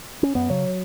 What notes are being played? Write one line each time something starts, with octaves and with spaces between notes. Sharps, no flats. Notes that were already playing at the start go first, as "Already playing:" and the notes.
C#4
F#2 B3
C#3 F#3